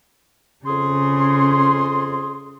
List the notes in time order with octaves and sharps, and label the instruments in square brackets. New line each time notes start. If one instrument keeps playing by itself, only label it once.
[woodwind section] F2 G#4 C6 [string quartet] C#3